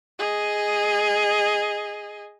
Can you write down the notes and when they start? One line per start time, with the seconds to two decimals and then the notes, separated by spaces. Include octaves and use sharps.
0.19 G#4 D#5